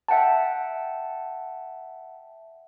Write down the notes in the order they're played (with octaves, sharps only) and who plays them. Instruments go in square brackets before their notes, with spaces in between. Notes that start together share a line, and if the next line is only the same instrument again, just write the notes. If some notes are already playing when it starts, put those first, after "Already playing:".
[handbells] E5 F#5 G5 A5